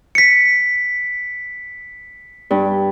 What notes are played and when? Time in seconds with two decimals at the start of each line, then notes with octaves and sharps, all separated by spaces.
0.15 B6 C#7
2.51 G2